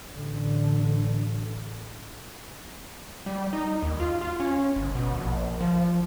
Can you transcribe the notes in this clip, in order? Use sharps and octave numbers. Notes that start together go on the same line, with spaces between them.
A1 D3
G3
D#4
D#2
F4
F4
C#4
G1
B2
A#1
F3